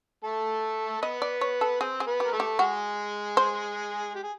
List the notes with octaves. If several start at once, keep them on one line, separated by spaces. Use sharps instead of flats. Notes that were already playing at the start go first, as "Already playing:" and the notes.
A3 A4
B3 B4 D#5
D5
C#5
A4
C4 G#4 C5
G#4
B3 B4
G4
A#4
A3 A4
G4
G#3 F#4 G#4
C5
G4
G#4